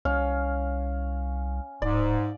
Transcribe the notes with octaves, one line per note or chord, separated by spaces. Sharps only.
C2 C#4 F5
D1 G#2 D5